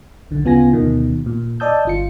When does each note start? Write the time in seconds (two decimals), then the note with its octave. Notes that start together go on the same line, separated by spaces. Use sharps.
0.31 B1 D3
0.44 D2 C#3 B3 F4 G#5 A#6
0.73 D2 B2 D#3
1.26 A#2
1.60 D5 D#5 A5 D#6 E6 G6
1.85 G1 F4 C#7